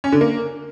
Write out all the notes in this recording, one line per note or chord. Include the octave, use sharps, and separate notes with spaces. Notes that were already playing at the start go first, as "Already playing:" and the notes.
C#4
D3
A#3